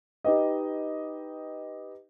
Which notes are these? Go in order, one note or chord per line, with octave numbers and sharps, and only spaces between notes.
D#4 G4 B4 D#5